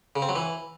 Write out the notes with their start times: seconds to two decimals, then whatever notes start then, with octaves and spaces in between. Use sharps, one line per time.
0.16 C#3
0.22 C4
0.29 F#3
0.36 E3